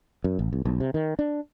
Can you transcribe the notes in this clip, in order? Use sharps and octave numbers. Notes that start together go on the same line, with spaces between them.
F#2
A1
C2
B1
C3
D#3
D4